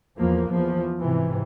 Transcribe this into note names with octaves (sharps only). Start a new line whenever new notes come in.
E2 F3 A#3
E2 F3
G#2 C3 E3